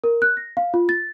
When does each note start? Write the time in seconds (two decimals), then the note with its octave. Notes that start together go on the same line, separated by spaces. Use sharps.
0.04 A#4
0.22 F#6
0.37 A#6
0.57 F5
0.74 F4
0.89 A6